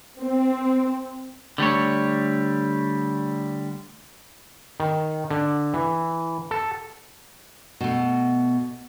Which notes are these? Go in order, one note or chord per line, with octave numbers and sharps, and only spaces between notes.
C4
D3 G3 A3 C#5
D#3
D3
E3
A4
B2 A3